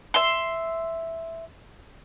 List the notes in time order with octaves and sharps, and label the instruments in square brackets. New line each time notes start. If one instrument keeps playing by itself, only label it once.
[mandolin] E5 C6